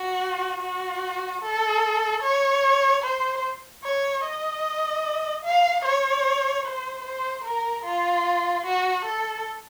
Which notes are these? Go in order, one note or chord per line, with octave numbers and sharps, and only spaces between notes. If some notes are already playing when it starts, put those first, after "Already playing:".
Already playing: F#4
F#4
A4
C#5
C5
C#5
D#5
F5
C#5
C5
C5
A#4
F4
F#4
A4